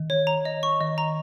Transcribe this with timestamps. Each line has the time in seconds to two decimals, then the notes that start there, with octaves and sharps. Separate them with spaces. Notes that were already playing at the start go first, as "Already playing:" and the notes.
Already playing: D#3
0.10 C#5
0.27 A#5
0.45 D#5
0.63 C#6
0.81 D#3 D#5
0.98 A#5